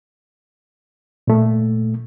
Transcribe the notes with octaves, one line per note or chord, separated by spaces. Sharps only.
A#2 A3